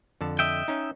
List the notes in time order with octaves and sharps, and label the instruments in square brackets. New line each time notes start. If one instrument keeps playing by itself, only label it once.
[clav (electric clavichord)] F2 D3 A5
[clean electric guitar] D#5 E5 G5
[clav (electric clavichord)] C#4 D#4